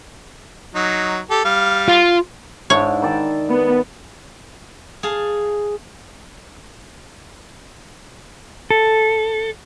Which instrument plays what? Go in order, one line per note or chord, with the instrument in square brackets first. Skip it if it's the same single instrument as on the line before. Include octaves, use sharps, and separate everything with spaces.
[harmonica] F#3 D#4
G4 A4
G3 F5
[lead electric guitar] F4
[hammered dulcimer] G#2 D4 E4 [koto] C#5
[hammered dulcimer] D#3 D5 A5
[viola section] B3
[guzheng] G#4 F5 A5
[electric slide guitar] A4